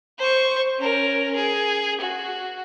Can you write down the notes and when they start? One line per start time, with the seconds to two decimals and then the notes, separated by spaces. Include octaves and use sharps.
0.19 C5 C#6
0.79 C#4 A#4
1.36 G#4
2.01 F#4